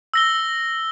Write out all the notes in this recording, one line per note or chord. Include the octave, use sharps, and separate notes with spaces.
E6 A#6 G7